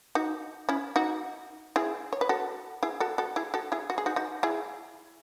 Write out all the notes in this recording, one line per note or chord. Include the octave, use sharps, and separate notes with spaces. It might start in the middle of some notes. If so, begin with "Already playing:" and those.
D#4 F#4
C#4 E4
D#4 F#4
E4 G#4
C#5
B4
F#4 A4
E4 G#4
F#4 A4
F#4 A4
E4 G#4
F#4 A4
E4 G#4
F#4
G#4
D#4 F#4
D#4 F#4
E4 G#4